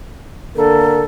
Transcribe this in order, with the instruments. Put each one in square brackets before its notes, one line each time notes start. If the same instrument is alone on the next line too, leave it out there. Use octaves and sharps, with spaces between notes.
[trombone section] D3 A#3 A#4 [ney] A4